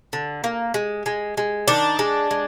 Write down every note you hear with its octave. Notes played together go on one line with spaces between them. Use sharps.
D3
A#3
G#3
G#3
G#3
D#3 D4
G#3
G#3